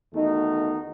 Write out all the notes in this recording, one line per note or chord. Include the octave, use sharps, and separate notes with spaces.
E2 D#3 A3 D#4 F#4